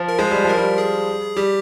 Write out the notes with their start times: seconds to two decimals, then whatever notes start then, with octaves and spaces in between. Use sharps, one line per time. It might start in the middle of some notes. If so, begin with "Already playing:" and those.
Already playing: F3
0.08 A#4
0.19 G#3 C5
0.31 G3
0.44 F3
0.49 A#4
0.57 G3
0.78 G#4
1.36 G3 G4